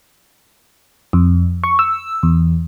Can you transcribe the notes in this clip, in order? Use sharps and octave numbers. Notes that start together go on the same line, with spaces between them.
F2
C#6
E6
E2